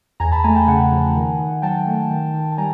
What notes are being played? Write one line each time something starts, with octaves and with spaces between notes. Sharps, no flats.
E2 G#5 A#5
A5 B5
A3 G#5 A#5
G5 A5
C#3 F#5 G#5
F3
D#3
D#3
F#3 G5 A5
A3
D#3
D#3
A5
G3 G#5 A#5